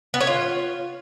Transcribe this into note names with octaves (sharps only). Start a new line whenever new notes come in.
B3
C#5
F4